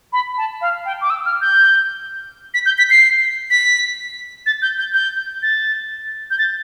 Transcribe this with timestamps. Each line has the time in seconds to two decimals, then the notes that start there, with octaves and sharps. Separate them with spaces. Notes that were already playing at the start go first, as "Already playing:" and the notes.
0.13 B5
0.38 A5
0.61 F5
0.86 G5
1.01 D6
1.10 E6
1.26 F6
1.41 G6
2.54 B6
2.66 G6
2.78 B6
2.90 C7
3.51 B6
4.46 A6
4.62 G6
4.79 G6
4.94 G6
5.43 A6
6.31 G6
6.39 A6